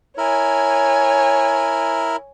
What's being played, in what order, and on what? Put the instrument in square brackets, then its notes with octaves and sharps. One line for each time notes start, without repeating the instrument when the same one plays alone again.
[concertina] E4 A#4 [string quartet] C#5 G#5